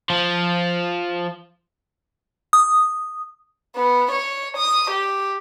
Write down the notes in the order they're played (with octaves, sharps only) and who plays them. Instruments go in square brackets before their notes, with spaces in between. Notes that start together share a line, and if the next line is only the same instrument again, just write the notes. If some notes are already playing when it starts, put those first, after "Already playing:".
[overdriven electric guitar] F3
[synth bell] D#6
[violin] B3
C#5
D#6
G4